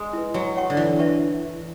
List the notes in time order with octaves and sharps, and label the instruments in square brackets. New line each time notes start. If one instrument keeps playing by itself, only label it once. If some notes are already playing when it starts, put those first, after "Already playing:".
Already playing: [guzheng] G#3
[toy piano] E4 B4
[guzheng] F#3 [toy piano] F#4
[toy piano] C#5 F#5 C#6
[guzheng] D3
[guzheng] E3 [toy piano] E4
[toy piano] B4 E5 A5 C#6